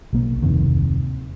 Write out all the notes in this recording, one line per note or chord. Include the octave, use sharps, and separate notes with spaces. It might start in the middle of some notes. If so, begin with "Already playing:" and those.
B1 A#3
D1 F2 C3 D#3